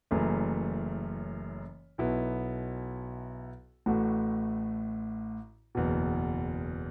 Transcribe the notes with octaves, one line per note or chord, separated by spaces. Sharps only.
F#1 F#2 E3 A3
B1 B2 B3 E4
A1 A2 A3 F#4
F#1 E2 B2